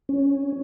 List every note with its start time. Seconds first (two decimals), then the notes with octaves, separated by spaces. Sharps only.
0.09 C#4